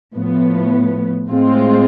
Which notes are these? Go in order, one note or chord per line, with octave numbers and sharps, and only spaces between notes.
A2 F3 B3
A2 G#3 C4 F4